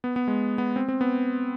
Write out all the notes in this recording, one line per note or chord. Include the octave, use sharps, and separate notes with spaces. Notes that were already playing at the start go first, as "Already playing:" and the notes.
B3
B3
G#3
B3
C4
C4
B3